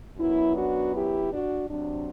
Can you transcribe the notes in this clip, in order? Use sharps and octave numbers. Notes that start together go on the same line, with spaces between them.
F#2 F#3 B3 E4
D4 F#4
E4 G4
D4 F#4
C3 F#3 C4 D4